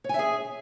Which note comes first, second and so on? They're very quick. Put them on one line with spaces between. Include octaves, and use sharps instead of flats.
C#5 G#5 E5 G#4